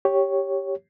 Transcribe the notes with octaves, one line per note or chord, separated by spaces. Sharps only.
G4 C#5